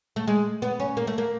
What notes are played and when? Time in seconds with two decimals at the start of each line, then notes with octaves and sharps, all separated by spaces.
0.16 A3
0.28 G#3
0.62 B3
0.80 C#4
0.97 A#3
1.07 A3
1.18 A#3